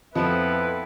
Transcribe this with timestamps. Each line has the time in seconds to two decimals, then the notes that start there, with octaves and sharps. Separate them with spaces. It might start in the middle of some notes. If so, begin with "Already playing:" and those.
0.15 F2 F3 B3 C4 E4 A4 B4